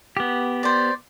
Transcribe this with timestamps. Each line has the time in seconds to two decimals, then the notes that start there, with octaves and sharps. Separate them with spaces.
0.17 B3 G4
0.63 C5 D5